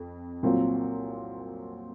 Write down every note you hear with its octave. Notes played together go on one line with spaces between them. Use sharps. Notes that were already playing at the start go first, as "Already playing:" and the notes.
Already playing: F2
C2 A#2 F#3 C4 F4